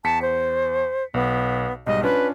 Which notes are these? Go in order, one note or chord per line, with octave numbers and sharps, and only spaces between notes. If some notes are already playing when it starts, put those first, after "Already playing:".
E2 A5 B6 C#7
C5
B1 B3
B1 G#2 G3 D#5
C#4 D4 F4 B4